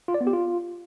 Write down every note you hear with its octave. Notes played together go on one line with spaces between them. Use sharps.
F4
D5
B3
G4
F4